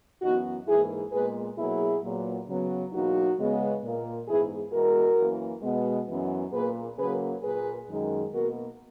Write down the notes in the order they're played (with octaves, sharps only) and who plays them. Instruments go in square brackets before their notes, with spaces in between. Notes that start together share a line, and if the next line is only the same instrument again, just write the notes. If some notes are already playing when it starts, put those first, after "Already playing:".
[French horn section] F#2 E3 B3 D#4 F#4
G#2 E3 A#3 E4 G#4
A#2 G#3 B3 G#4 B4
B2 F#3 A#3 E4 G#4
A#2 F#3 B3
C#3 F#3 B3
E2 B2 F#3 A#3 D#4 F#4
C#3 G#3 B3
A#2 A#3
G#2 E3 B3 E4 G#4
E2 B2 G#3 F#4 A#4
F#2 E3 A#3
B2 G#3 B3
F#2 E3 B3
A#2 A#3 G#4 B4
C#3 F#3 A#3 G#4 B4
A#2 A#3 G#4 B4
F#2 D#3 G#3
B2 A#3 F#4 A#4